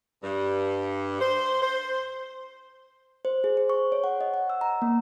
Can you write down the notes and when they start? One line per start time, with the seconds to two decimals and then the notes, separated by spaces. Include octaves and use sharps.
0.24 G2
1.20 C5
1.63 C5
3.25 C5
3.44 G#4
3.57 C5
3.70 C#6
3.92 C#5
4.04 F#5
4.21 D#5
4.34 F#5
4.50 E6
4.61 A#5
4.82 A#3